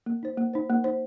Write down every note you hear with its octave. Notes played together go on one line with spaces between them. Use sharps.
A#3
D#4 C5
A#3
D#4 C5
A#3
D#4 C5